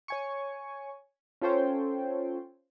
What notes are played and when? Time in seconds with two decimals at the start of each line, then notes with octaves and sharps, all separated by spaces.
0.08 C#5 G#5 C#6
1.42 C#4 F4 A4 C5 C#5 G5